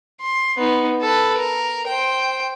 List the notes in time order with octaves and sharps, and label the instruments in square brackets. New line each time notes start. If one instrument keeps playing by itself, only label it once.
[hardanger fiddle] C6
B3 D#4
A4 B4
A#4
C5 G5